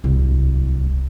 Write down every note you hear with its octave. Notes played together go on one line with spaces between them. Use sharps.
D1 C2